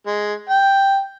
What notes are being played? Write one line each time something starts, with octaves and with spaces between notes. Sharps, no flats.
G#3
G5